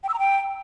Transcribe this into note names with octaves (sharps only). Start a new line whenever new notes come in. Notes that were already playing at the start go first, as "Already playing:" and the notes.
G5
E6
A#5
G5